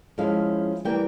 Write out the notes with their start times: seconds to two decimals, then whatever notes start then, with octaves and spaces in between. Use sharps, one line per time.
0.18 F3 G#3 C#4 E4 F5
0.85 E3 G3 A#3 G5